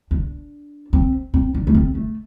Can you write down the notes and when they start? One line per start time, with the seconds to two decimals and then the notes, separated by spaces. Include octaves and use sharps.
0.11 D4
0.93 C4
1.34 C4
1.54 D4
1.67 A3
1.75 C4
1.95 A3